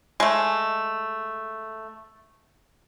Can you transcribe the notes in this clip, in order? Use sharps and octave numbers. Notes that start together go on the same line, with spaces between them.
G#3 A3